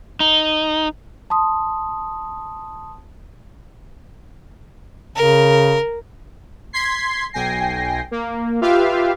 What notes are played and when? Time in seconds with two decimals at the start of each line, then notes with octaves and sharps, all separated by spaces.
0.20 D#4
1.30 A5 C6 D#6
5.16 C#3 A#4
6.73 C6 G#6 B6 C7
7.33 B1 G5 G#5 A#6 C7
8.11 A#3
8.61 F4 G4 B4 E5 F5